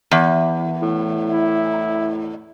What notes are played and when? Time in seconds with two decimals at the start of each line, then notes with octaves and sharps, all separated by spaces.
0.11 E2
0.82 A2
1.31 E4